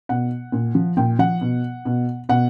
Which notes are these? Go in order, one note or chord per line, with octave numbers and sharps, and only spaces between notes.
B2 F#5
A#2
F3
A#2 G5
F3 F#5
B2
B2
B2 F#5